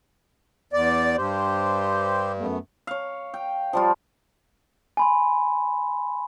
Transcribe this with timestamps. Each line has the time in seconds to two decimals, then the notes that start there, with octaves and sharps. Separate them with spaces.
0.73 E2 D5
1.17 G2 G4 C5
2.39 F#2 A3 B3
2.87 C#5 F5
3.34 G5
3.73 F3 G3 F4
4.97 G#5 B5 C6